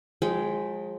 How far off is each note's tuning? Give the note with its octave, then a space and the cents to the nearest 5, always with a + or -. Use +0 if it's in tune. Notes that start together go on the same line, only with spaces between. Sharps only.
F3 +45 G#3 +0 G5 -10